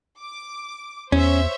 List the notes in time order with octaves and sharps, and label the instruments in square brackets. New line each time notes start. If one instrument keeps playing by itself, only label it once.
[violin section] D6
[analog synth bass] E2 [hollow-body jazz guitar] C#4 [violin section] C5 C#5 E5